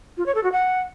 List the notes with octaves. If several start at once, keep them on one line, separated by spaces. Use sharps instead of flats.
F4
C#5
A4
F#4
F#5